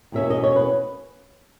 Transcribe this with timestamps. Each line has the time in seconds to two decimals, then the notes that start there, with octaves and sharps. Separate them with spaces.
0.12 E2 B2 A#3 C#4 E5
0.30 D#5
0.44 C#5
0.56 B4